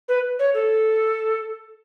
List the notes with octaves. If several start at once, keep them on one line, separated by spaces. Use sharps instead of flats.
B4
C#5
A4